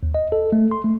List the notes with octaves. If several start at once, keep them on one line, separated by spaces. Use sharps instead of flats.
D#2
D#5
A4
A3
C6
A3